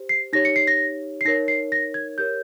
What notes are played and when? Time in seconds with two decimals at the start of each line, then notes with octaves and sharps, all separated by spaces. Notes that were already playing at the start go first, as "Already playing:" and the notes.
Already playing: G4 C5
0.09 C7
0.33 D#4 G4 C#5 A#6
0.45 C#7
0.56 C7
0.67 A#6
1.21 C7
1.25 D#4 A#4 C#5 A#6
1.48 C7
1.72 A#6
1.94 G#6
2.18 G4 A#4 C#5 G6